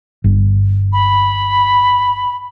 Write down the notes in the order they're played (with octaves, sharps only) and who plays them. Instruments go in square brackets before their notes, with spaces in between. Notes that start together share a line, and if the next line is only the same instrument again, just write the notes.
[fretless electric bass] G1
[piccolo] B5